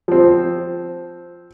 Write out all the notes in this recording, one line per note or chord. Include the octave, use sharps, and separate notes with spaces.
F3 C4